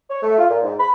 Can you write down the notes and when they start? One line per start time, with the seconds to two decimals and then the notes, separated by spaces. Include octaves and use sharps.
0.10 C#5
0.22 A3
0.38 F4
0.49 A#2
0.63 G#2
0.79 B5